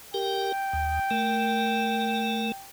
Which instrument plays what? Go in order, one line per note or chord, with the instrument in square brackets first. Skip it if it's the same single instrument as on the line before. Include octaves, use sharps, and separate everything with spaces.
[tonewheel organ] G4 A#4 [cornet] G5
[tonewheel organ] D#2
A3 A#4